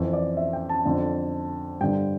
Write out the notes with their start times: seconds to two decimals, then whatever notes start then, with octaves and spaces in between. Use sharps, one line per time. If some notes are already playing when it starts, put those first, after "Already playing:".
Already playing: F2 E3
0.13 D5
0.37 E5
0.53 G5
0.69 A5
0.85 F2 D3
1.81 G2 D3 G5